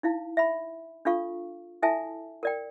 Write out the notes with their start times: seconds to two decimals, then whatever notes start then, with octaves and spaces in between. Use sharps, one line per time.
0.03 D#4 E4 F5
0.37 E5 B5
1.05 D4 F4 A4 F5 C#6
1.82 E4 A4 E5 G#5 A5
2.43 A#4 D5 G5